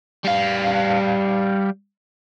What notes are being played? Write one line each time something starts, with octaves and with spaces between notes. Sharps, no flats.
G3 F5